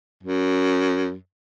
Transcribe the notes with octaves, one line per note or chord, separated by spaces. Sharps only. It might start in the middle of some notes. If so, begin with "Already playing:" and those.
F#2